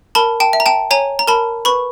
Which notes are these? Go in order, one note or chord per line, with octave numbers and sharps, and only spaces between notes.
A#4 A5 B5
G5 A5
E5
A#5
G5 A5
C#5 G#5 A#5
A#5
A#4 A5 B5
B4 B5 C#6